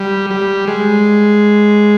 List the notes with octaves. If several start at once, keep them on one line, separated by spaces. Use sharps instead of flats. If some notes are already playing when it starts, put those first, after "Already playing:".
Already playing: G3
G3
G#3